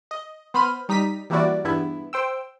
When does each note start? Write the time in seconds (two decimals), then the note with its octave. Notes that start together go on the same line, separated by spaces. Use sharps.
0.11 D#5
0.54 B3 C5 B5 F6 D#7
0.89 G3 D#4 A#5 B6 D#7
1.30 E3 G3 A#3 E4 F#4 D5
1.64 E2 G2 B3 E4
2.13 C5 G5 E6